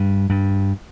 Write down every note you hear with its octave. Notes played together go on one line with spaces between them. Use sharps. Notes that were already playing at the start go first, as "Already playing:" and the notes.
Already playing: G2
G2